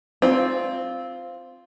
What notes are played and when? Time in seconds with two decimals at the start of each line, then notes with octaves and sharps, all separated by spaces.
0.22 C4 F4